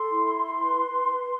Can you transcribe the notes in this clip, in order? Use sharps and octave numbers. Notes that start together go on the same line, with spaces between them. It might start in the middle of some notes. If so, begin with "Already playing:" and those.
Already playing: A4 C6
E4
B4